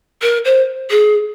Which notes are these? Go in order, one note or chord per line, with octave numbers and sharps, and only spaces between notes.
A#4
C5
G#4